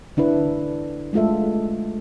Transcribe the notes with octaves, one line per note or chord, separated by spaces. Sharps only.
D3 D4 E4 B4
G#3 A3 F4 A4 E5